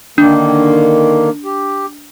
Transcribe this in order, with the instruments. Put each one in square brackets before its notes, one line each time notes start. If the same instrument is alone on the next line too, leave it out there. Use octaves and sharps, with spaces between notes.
[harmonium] D3 D#3 A#3 [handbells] D4
[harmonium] G4